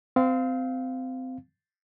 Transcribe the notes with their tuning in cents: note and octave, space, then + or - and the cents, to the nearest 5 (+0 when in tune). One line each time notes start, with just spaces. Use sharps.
C4 -25 F5 +0